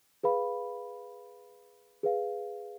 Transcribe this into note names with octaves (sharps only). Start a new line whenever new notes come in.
G#4 B4 F5 B5
G#4 B4 F5